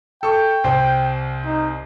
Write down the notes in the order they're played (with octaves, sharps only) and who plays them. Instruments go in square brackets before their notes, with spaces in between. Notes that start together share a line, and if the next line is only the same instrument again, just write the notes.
[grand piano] A4 C#6 [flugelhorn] G5
[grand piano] C2 C4 C6
[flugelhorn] D#4